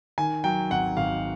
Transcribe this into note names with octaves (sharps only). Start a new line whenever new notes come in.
D#3 G#5
F#3 G5
G#1 F#5
G#1 F5